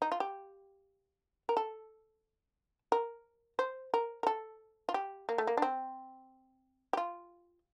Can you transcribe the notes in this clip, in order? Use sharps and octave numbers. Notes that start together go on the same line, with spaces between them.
D#4
F4
G4
A#4
A4
A#4
C5
A#4
A#4
A4
F4
G4
A#3
A3
A#3
D4
C4
G4
F4